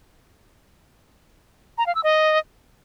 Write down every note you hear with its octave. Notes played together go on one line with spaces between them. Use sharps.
A#5
F5
E6
D#5